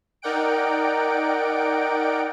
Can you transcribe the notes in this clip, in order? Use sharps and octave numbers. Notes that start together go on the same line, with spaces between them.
D#4 A#4 D5 F#5 G5 D7